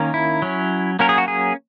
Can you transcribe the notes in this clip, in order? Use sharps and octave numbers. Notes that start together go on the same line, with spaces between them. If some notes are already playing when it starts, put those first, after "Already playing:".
Already playing: D#3 A#3 C#4
E4
F#3 C#4
F#3 A#3 C#4 A#4
G#4
F#4
G#4